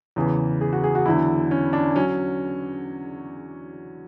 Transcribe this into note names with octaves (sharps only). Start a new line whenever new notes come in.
E2 C#3 E3
G#4
F#4
G#4
F#4
E2 D3 F#3 E4
C#4
D4
F#3 C#4